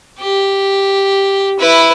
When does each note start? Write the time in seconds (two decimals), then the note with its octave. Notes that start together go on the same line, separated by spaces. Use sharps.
0.19 G4
1.59 E4 B4